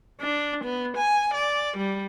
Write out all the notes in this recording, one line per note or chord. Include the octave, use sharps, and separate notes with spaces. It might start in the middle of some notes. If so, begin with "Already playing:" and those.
D4
B3
G#5
D5
G3